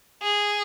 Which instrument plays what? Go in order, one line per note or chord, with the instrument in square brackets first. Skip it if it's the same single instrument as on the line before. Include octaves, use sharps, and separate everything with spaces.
[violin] G#4